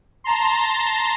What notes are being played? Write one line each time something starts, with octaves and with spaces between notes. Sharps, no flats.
A5 A#5 C6